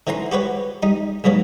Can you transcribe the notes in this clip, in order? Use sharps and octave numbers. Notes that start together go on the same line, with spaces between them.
D3 E3 C#4 A#5 C6
F#4 G4 B4 C#5
G3 D#4
B1 G#2 B2 F#3 A#3